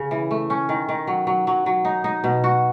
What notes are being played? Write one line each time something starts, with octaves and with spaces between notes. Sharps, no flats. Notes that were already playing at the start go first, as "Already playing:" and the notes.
Already playing: C#3
E3
A3
C#4
D#3
D#3
F#3
F#3
F#3
F#3
D#4
D#4
B2
F#4